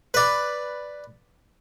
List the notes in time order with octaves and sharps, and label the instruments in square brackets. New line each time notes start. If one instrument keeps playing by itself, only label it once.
[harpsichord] B4 D5